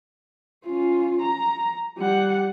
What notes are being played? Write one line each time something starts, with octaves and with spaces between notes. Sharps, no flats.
C#4 F4
A#5
G3 F#5